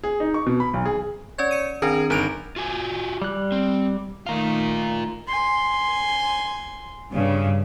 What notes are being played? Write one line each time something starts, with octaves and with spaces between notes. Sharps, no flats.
G#4
D#4
C#6
B2
B5
B1
G#4
C#4 C#5 D5 G#6
C#7 D#7
D#3 C4 D4 G#4 A#4
G1 D#4 A#4 D7 F7
F4 F#4 G#5
G3 F#6
C4
D#3 A3 D#4 F4 A#4
G#5 C6
G2 C#3